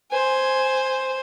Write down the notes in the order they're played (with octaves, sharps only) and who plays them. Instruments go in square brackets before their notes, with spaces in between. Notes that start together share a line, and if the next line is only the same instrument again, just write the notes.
[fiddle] C5 G#5